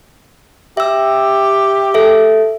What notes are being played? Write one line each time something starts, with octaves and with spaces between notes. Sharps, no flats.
G4 E5 E6
A4 E5